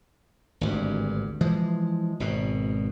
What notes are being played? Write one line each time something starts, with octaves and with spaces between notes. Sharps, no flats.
G#1 D2 G2
E3 F3 G#3
G#1 B2